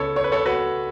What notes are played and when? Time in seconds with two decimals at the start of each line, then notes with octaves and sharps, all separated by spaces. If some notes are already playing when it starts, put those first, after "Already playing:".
Already playing: C#2 C#3 A4 B4 C#5
0.16 C#5
0.24 B4
0.32 A4 C#5
0.45 F#4 B4